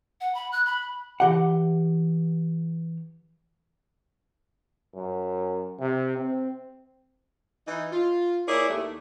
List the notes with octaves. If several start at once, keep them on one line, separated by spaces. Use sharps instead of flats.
F#5
B5
F#6
B5
E3 G4 F#5
F#2
C3
C4
E3 D#4
F4
A#3 E4 G#4 A#4 C#5 D5
D#2 A3